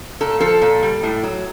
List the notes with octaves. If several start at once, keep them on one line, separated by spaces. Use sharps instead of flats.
A#2 A4
F3 A4
A#2
G3
A2
F#3